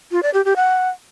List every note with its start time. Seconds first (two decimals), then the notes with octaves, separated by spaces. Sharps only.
0.12 F4
0.23 D5
0.34 G4
0.45 G4
0.56 F#5